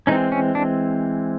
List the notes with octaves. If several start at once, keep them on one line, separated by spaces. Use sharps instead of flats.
E3 G#3 C4 C#4 D#4
C#4
D4